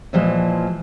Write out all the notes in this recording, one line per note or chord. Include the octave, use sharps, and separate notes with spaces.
A#2 E3 F3 G#3